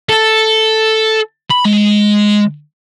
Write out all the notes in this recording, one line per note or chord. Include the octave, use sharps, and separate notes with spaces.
A4
B5
G#3